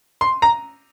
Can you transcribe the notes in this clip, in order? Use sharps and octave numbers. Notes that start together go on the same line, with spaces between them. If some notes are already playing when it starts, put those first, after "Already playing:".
C6
A#5